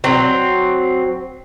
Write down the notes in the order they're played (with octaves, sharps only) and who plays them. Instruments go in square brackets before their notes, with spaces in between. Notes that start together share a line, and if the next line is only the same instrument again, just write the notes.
[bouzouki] F#3 C4